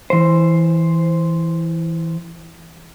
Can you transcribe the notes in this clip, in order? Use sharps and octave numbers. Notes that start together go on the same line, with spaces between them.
E3 C5